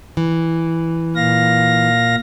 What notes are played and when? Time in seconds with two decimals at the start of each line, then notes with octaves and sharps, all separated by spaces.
0.17 E3
1.16 A#2 F5 A#6